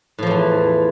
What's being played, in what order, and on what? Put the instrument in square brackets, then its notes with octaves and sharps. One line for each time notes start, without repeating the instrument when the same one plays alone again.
[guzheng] A2
F3
E2
E3